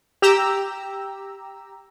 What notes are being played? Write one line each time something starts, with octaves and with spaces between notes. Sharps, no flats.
G4 A#5 E6